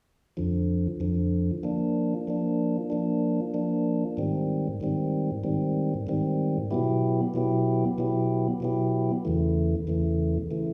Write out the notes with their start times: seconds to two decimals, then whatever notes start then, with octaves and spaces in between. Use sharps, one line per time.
0.37 F2 D3 F3
1.00 F2 D3 F3
1.63 F3 A#3 D4
2.27 F3 A#3 D4
2.90 F3 A#3 D4
3.54 F3 A#3 D4
4.17 G#2 D#3 G3 C4
4.80 G#2 D#3 G3 C4
5.44 G#2 D#3 G3 C4
6.07 G#2 D#3 G3 C4
6.71 B2 F#3 B3 E4 G4
7.34 B2 F#3 B3 E4 G4
7.98 B2 F#3 B3 E4 G4
8.60 B2 F#3 B3 E4 G4
9.25 E2 C#3 E3 A3
9.87 E2 C#3 E3 A3
10.51 C#3 E3 A3